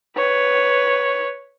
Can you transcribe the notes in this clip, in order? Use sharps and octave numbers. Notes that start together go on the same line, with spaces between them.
B4 C#5